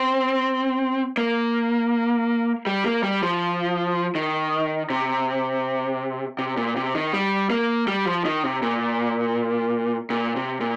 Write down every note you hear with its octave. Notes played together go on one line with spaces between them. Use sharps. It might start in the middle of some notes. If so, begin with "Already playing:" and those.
Already playing: C4
A#3
G3
A#3
G3
F3
D#3
C3
C3
A#2
C3
D#3
G3
A#3
G3
F3
D#3
C3
A#2
A#2
C3
A#2